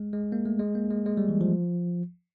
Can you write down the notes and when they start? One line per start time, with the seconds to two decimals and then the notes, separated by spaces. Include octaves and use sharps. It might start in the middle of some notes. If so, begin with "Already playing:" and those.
Already playing: G#3
0.13 G#3
0.32 A#3
0.46 A3
0.59 G#3
0.75 A#3
0.91 G#3
1.06 G#3
1.17 G3
1.29 E3
1.41 F3